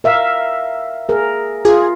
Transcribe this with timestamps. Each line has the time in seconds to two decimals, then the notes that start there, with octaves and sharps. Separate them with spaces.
0.04 A#4 E5 F5
1.09 G#4 A#4
1.65 F4 G#4